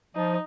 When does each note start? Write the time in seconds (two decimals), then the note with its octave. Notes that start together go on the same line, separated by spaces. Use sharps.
0.15 F3 D#4